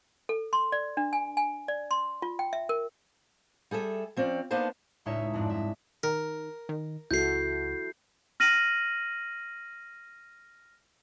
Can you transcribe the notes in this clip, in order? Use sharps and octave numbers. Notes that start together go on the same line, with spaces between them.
A4
C6
D5
D4
G#5
G#5
D5
C6
F4
G5
E5
A#4
G3 G#4 A4 E5
F3 C4 C#4 D5
A#3 B3 D4 D#4 C5 A5
C#2 A2 C#4 D#4 C#5 E5
F2 G#2 D4
C2 E5
D#3 A#4
D#3
C#2 E4 F#4 A4 G6 C7
F6 A#6 D#7 F#7